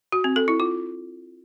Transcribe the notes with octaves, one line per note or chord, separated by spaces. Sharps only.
F#4
C4
A4
E4
F4